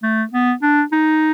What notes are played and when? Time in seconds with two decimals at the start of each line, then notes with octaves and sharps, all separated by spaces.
0.03 A3
0.33 B3
0.62 D4
0.92 D#4